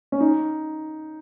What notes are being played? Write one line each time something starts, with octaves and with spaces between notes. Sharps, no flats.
C#4
D#4